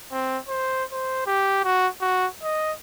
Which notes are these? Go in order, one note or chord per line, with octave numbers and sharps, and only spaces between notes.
C4
C5
C5
G4
F#4
F#4
D#5